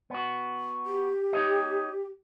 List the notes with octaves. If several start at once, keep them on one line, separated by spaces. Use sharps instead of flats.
B3 F#4
G4
D#4 C#5 D#5